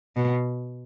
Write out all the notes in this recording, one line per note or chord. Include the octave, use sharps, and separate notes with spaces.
B2